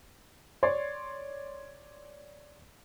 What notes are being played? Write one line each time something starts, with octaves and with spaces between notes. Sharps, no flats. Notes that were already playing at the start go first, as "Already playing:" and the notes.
C#5 D5 C6